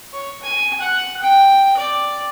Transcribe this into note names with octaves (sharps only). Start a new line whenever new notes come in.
C#5
G#5
F#5
G5
D5